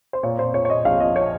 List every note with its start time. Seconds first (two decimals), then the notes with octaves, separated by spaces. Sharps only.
0.13 C5
0.23 A#2 C#5
0.39 A#2 C5
0.54 A#2 C#5
0.65 C#5
0.70 A#2 D#5
0.85 A#1 F5
1.00 F3 D#5
1.16 C#5